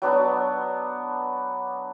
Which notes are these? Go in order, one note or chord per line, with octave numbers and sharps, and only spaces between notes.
F#3 B3 D4 F#4